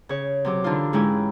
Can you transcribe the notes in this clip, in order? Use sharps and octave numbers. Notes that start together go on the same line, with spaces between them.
C#3 C#5
C3 F#3 D6
D3 E3 D4 D#4 F4
G#2 G#3 C#4 E4 G5 G#5